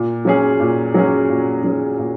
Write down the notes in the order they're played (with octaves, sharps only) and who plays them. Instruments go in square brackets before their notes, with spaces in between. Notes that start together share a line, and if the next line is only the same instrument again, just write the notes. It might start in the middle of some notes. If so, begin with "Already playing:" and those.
Already playing: [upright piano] A#2
F#3 C#4 G#4
A#2
F#3 C#4 G#4
A#2
F#3 C#4 G#4
A#2